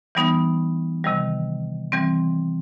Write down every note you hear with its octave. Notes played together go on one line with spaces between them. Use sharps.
E3 G3 B3 D#4
C3 D#3 G3
E3 G3 C4